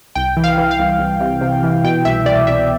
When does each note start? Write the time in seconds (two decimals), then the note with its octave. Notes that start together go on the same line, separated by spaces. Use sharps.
0.15 C2 G5
0.37 E3
0.44 F5
0.58 E3
0.71 F5
0.79 C2
0.99 C2
1.20 C3
1.41 C3
1.63 E3
1.84 B2 G5
2.05 C2 E5
2.25 C2 D5
2.47 C2 E5